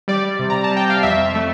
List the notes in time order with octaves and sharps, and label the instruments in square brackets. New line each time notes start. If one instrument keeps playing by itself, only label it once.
[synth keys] G3 D5
C3
A#5
A5
G3
G5
F5
F2 E5
A3